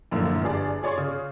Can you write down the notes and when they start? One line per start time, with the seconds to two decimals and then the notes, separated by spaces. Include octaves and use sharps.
0.11 A#1 F#2 A2 D3 A#3
0.42 G1 G2 G#4 D5
0.83 G#4 C#5 D5 C6 C#6
0.98 C#3